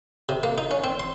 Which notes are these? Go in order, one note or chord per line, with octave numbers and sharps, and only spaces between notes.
C3
A#3
D#4
C#4
C4
C6